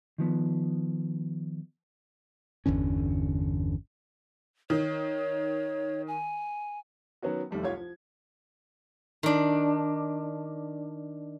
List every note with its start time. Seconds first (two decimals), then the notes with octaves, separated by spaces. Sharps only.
0.18 D#3 F3 B3
2.66 G1 E2 D3 C#4
4.70 D#3 C#5
6.08 G#5
7.22 D#3 F#3 B3 C#4 F#4
7.51 F1 D#2 G3 A3
7.63 C2 F4 G4 C#5 G#6
7.77 F3
9.23 D#3 D4